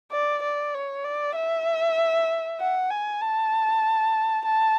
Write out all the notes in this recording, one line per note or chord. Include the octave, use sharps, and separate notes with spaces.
D5
D5
C#5
D5
E5
F#5
G#5
A5
A5